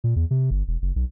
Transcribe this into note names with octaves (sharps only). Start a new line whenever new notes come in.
A#2
E2
C3
G1
E1
F#1
B1